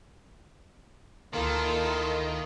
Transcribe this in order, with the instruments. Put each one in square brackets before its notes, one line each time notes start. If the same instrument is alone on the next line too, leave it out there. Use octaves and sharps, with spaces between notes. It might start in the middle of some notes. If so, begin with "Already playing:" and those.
[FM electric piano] D2 A#4 C6 [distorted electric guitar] D#3 [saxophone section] A#3 [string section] E4 F4 A4